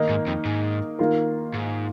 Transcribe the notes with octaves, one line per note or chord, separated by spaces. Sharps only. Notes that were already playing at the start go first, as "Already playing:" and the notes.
Already playing: D#3 A#3 D#4 A#4
G#2
F2
G#2
D#3 A#3 F4 A#4
G#2